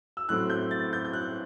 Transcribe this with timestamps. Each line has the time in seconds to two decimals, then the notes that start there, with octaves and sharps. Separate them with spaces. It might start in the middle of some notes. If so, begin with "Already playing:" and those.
0.17 E6
0.29 A2 F#3 A3 C4 F#6
0.50 G6
0.71 A6
0.93 G6
1.05 G6
1.13 F#6